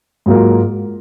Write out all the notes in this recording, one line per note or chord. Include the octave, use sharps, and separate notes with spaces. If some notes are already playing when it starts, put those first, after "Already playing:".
G#2 F#3 A#3 F4 A#4